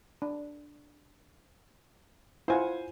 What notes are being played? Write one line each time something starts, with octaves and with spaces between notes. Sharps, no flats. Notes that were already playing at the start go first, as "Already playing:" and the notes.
D4
E4 F4 C5 F#5 G#5